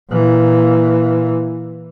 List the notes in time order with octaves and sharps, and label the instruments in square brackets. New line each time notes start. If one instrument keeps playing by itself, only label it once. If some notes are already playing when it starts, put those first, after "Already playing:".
[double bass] A#2 E3